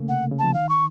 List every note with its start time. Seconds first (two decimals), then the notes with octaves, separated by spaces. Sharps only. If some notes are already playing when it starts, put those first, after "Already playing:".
Already playing: C#3 A3 A#3
0.09 C3 F#5
0.31 C#3
0.39 F3 A5
0.54 D#3 F5
0.69 C#6